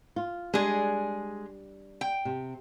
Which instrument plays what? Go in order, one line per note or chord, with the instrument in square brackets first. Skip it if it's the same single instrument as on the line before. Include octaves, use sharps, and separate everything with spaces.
[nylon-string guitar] F4
[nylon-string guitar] G3 D4 [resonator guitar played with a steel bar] G#3 G#4
[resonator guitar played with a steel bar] G5
[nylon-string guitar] C3